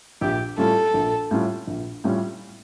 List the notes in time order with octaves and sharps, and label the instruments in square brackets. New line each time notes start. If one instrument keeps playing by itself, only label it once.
[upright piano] A#1 [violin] G4
[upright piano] A2 G3 C#4 F4 [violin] A4
[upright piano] A#1
A2 G3 C#4 F4
A#1
A2 G3 C#4 F4